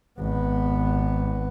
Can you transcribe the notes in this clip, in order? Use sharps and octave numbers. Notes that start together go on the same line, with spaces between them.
G#1 B3